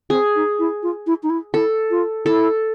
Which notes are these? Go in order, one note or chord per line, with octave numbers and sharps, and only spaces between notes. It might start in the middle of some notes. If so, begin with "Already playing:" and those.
C4 G#4
D#4
E4
F4
E4
D#4
E4
E4 A4
F4
E4 A4